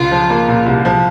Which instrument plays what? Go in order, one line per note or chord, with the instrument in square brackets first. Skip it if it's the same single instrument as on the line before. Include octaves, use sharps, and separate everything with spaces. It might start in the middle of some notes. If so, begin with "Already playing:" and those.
Already playing: [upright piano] C#2 [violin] F4
[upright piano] F3
A#3
A#2
C2
F3